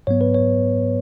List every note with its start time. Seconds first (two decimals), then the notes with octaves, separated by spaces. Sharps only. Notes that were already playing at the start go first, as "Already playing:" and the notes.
0.07 G#2 F#3 B3 C#5
0.21 B4
0.35 C#5